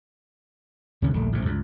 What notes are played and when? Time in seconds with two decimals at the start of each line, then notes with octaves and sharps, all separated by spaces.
1.02 D2 C3 D#3 C#4
1.14 D#1 A#1 D3 A3
1.32 A1 A2 C3
1.45 C#2 G2